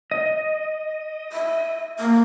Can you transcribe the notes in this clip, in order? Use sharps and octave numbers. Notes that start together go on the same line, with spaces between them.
D#5
E5
A#3